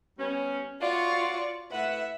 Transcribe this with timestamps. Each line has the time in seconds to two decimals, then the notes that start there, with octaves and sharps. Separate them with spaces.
0.18 G3 B3 C#4
0.81 F4 F#4 C#5 D5 C#6
1.71 A2 B4 E5 F#5